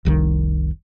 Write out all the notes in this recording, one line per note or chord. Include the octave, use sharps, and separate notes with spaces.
F1 C2 D#3